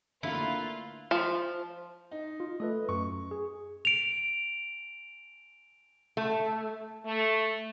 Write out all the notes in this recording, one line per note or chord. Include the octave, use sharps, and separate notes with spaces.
D3 A3 A#3 E4 F4 B4
F3
D#4
F4
A3 A4 B4 D#5
F#2 C#6
G#4
D7 F7
A3
A3